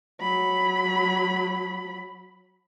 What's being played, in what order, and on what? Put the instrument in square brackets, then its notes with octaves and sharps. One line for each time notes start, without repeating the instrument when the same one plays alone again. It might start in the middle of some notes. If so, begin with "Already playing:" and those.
[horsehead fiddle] F#3 B5